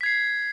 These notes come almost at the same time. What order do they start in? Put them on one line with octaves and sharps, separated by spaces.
B6 G#6 C7